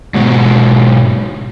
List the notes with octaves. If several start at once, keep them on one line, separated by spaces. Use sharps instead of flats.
G#2 B2